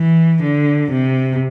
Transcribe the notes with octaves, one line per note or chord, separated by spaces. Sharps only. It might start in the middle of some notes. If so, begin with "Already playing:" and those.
Already playing: E3
D3
C3